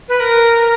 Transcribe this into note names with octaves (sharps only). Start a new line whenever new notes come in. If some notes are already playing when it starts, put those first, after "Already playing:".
B4
A#4